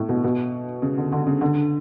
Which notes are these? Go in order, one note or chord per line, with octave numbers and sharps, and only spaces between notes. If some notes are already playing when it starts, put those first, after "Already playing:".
Already playing: A2
B2
B2
C#3
D3
D3
C#3
D3